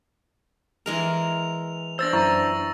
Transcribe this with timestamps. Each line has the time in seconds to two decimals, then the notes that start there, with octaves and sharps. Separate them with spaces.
0.86 E3 G#3 A#4 F7
1.99 D4 C5 E6 A6 A#6
2.13 F#2 E4 A#5 C#6 A6